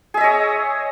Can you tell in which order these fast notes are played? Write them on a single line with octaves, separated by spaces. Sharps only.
G#4 E5 D#5 C#5